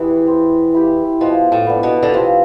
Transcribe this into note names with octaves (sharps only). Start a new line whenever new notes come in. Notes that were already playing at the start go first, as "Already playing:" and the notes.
Already playing: E2 E3 C4 E4 G4
C4
E4 G4
B2 F3
A2
B3 D4
B2
D3
C3 F3